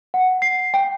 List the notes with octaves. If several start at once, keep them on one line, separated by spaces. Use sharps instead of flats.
F#5
C7
G5